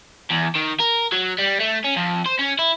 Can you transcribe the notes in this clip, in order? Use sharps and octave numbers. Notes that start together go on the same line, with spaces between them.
E2
D#3
A#4
F#3
G3
A3
C#4
F2
C5
C#4
E4